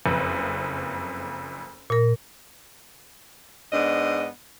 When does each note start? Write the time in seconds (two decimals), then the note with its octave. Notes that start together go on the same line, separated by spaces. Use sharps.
0.06 F#1 F2 B4
1.90 A#2 A#4
3.72 G#2 B3 D4 D#5